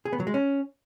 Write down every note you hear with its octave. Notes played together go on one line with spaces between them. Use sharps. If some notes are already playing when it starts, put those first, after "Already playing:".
G#4
B3
F#3
G#3
C#4